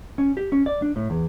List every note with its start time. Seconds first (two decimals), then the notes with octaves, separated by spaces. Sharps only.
0.18 C#4
0.37 G4
0.52 C#4
0.66 D5
0.82 D4
0.96 A2
1.10 E2